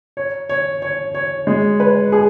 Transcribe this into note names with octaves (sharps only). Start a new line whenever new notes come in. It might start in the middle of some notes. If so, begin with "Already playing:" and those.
C#5
C#5
C#5
C#5
G#3
B4
G#4